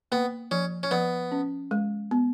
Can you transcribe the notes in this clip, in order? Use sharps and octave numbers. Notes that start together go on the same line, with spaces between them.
A#3 B3
F3 C#4
C#4
F3 B3
C#4
G#3
B3